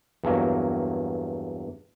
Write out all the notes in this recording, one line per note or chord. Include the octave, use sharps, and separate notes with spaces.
E2 G2 F#3 A#3